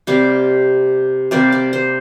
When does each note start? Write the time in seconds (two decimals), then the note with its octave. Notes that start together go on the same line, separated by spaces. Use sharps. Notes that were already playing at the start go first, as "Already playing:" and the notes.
0.07 C3 G3 A#3 D5
1.31 C3 G3 A#3 D5
1.52 D5
1.73 C5